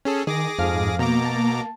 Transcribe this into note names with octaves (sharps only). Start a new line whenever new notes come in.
C#4 G#4 A4
D#3 G#4 D6 A#6
F2 G#2 F5
B2 A#3 A#5 D6
A5